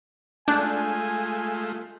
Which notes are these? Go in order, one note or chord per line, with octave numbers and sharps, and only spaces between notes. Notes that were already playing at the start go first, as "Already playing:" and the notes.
G#3 A3 D4 F4 G#5 F#6 G6